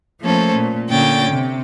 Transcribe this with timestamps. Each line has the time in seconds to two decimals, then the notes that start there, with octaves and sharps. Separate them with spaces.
0.21 F3 A3 A#3 C#4 A4 C5
0.55 A#2
0.90 A#2 D3 C#4 G5 A6
1.31 C3